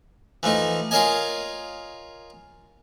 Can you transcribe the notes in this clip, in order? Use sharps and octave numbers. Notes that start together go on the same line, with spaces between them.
E3 F3 A3 D#4
F4 G#4 A#4 C#5 D#5 G#5